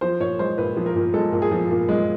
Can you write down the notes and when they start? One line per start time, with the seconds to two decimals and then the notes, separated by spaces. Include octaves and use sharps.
0.01 F3 C5
0.20 A#2 C#5
0.39 G#3 C5
0.58 A#2 B4
0.77 F3
0.86 A#4
0.96 A#2
1.14 G#3 A4
1.32 A#2
1.42 G#4
1.52 F3
1.70 A#2
1.89 G#3